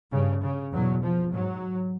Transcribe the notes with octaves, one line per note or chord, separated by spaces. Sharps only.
G2 C#3
C#3
E2 B2 F#3
F3
G#2 F#3